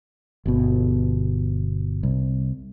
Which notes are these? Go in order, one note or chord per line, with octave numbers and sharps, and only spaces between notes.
G1 B2
C2